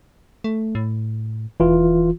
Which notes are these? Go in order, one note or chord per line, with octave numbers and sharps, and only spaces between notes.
A3
A2
E1 E3 F4